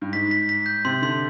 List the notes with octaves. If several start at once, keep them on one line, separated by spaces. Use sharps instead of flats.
G2
G#2 B6
B6
B6
G6
C3 C6
D3 C6